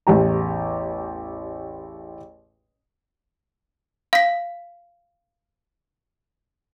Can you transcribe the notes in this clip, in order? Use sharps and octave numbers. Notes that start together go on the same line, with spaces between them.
A1 E2 G4 A#5
F5 B6